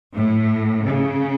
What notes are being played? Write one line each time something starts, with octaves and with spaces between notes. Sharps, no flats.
A2
C#3